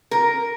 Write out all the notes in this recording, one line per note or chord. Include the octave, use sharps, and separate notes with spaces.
A#4